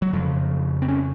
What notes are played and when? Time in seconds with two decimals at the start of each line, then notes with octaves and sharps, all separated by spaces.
0.02 F#3
0.13 F2 C#3 F3
0.82 C4
0.88 C#4